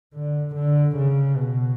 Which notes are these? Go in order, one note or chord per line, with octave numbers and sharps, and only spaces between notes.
D3
D3
C#3
B2